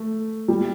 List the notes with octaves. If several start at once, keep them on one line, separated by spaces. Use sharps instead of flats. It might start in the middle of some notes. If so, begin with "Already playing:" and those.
Already playing: A3
G3